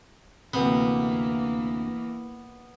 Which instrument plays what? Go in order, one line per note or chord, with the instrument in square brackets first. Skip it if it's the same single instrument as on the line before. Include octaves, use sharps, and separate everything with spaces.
[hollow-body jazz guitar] D2 C3 [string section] E3 A#3 [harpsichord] B3